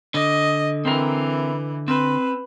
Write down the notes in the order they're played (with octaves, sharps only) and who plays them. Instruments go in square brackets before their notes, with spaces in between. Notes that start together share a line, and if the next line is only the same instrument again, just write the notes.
[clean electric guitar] D3 [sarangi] D#5
[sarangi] E3 [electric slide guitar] C4 A#4
[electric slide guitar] C4 [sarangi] B4